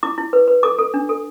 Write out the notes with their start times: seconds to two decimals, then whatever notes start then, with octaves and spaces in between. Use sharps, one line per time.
0.03 E4 D6
0.18 E4
0.33 B4
0.48 B4
0.63 A4 D6
0.79 A4
0.94 D4
1.09 A4